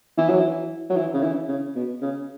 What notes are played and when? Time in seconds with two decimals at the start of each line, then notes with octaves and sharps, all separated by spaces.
0.18 E3
0.29 F#3
0.40 E3
0.90 F#3
0.96 E3
1.14 C#3
1.23 E3
1.48 C#3
1.75 B2
2.01 C#3